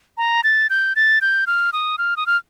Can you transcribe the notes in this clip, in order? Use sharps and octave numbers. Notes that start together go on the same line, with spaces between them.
A#5
A6
G6
A6
G6
F6
D#6
F6
D#6
F6